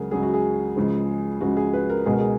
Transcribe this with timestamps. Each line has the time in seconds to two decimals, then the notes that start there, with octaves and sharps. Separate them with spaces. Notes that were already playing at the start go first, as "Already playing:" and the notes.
Already playing: C#2 C#3 F#3 G#4 A#4
0.11 C#2 C#3 F#3 G#4
0.23 F#4
0.34 G#4
0.76 C#2 C#3 F3 G#3
1.41 C#2 C#3 F3 G#3 F#4
1.57 G#4
1.74 B4
1.89 A#4
2.06 C#2 B2 G#3 G#4
2.13 A#4
2.20 G#4